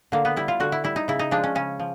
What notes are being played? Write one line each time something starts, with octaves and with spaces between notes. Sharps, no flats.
D3 A#3
B3
G3 E4
F4
D3 F#4
E4
G3 E4
D#4
C#3 E4
D#4
F3 G#3 D4
C#4
C#3 C#4
F3